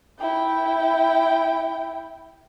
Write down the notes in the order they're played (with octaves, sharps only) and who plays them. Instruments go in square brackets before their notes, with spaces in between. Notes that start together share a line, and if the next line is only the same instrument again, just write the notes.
[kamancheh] E4 G5